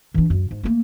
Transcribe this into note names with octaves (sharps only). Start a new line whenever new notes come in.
E3 D4
F#2
G#2
A3 A#3